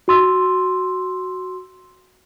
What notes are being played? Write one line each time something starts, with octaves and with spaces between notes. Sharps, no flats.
F#4 C6 E6